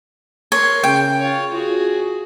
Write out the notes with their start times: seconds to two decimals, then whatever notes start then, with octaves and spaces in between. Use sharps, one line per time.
0.52 A#4 C#5 C6
0.84 C#3 G5
1.19 F4 C#5
1.53 F4 F#4 G#4